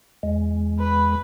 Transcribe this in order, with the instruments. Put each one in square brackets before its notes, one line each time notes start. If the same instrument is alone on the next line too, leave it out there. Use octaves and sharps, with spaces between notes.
[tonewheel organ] E2 G#3
[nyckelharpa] B4 B5